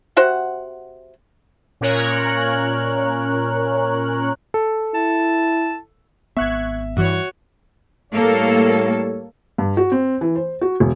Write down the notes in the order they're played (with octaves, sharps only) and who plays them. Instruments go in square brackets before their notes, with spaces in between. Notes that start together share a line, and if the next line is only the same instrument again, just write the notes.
[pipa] C3 F#4 C5 F#5
[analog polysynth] A#2 C#4 A#4 C#5 F#6
[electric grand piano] A4
[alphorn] E4 [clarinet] A5
[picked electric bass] G#1 B3 [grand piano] E5 [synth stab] C#6 F#6 G#6
[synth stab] G2 E3 [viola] F#4 C#5
[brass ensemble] A2 G3 C#5 [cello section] A#3 A4
[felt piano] G2
F#4
C4
E3
C5
F#4
E1